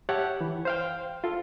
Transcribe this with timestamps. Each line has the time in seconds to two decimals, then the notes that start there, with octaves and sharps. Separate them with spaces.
0.09 G4 C#5 E5 F#5 A5
0.41 E3
0.65 C5 F5 G5
1.24 F4 A4